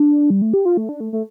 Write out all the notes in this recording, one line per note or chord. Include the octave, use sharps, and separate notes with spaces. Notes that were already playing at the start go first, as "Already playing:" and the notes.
Already playing: D4
G3
A3
G4
F4
A3
D4
A3
A3